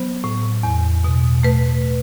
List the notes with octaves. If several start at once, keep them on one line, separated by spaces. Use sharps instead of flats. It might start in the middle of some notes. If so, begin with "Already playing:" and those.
Already playing: F#3 B3 C5
A2
E2
B2
A3 B4